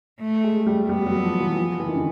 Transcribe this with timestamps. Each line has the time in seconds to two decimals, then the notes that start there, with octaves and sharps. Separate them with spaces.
0.21 A3
0.44 G#3
0.61 G#3
0.67 G3
0.89 G3 B3
1.06 F#3
1.24 F3
1.40 E3
1.57 F3
1.80 E3
1.88 D#3
1.95 D3